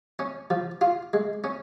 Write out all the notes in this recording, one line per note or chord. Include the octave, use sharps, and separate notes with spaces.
C#4
F3
F4
G#3
C#4